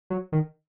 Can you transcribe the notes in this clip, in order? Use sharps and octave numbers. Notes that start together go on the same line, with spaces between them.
F#3
D#3